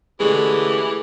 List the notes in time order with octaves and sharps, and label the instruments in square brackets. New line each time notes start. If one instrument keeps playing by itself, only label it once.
[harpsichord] D3 A3 C#4 [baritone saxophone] E3 [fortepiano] G#3 [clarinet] G4